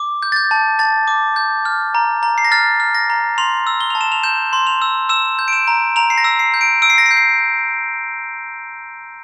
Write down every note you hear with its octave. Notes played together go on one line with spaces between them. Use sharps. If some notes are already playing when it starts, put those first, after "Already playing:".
Already playing: D6
G6
A6
G6
A5
A5 A6
D6
G6
F6
A#5
A#5
C7
A#6
F6 A6
F6
A#6
A#5
C6 F7
E6
G7
A5 F7
E7
F7
G6 E7
C6
F7
E6
E6 E7
G6
D7
E7
A#5
A#5 F7
C7
A#6
E6
C7
G6
D7
E6 D7
C7
A#6
C7
G6
C7